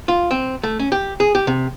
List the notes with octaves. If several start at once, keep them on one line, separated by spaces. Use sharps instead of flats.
F4
C4
A3
C#4
G4
G#4
G4
C3